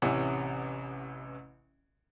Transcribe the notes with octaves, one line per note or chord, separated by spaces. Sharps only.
A1 C3 E3 C#4 F#5